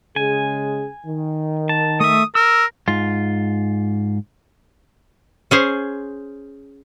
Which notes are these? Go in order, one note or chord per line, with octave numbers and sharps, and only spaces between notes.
C#3 G#3 G#4 G#5
D#3
A5
A3 E5 D#6
A#4 E6
G#2 F4
C#4 G#4 C5